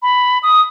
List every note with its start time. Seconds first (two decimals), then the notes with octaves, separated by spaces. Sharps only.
0.02 B5
0.43 D#6